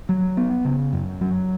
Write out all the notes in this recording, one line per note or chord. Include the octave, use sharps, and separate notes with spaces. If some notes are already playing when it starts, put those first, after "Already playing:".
F#3
B3
C#3
F#2
F#3